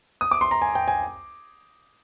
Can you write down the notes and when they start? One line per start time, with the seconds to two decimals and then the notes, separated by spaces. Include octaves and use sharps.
0.21 D#6
0.31 D6
0.41 C6
0.51 A#5
0.62 G#5
0.75 G5
0.88 G#5